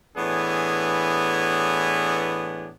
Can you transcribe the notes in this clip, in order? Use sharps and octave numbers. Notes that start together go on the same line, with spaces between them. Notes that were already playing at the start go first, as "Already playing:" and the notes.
A2 E3 B3 D4 G#4